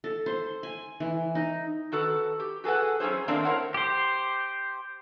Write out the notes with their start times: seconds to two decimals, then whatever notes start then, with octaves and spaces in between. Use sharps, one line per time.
0.04 A4
0.26 C5
0.63 G#5
1.00 E3
1.35 D#4
1.92 D#3 F#4 A4 B4
2.40 G4
2.64 F#4 G#4 A4 B4 F#5
3.00 F#3 C#4 E4 G#4 C5
3.28 D#3 A3 A#3 C4 D4 A#4
3.45 E4 A#4 C5 C#5 F#5
3.74 G4 C5